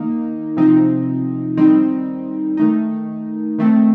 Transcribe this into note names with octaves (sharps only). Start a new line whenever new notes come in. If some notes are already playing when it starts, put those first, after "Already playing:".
Already playing: D#3 A#3 D#4
C3 F3 C4 D#4
D#3 G3 C4 D#4
D#3 A3 D#4
D#3 A3 C4